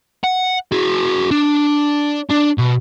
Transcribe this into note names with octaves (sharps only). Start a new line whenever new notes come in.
F#5
F#4 G#4
D4
D4
B2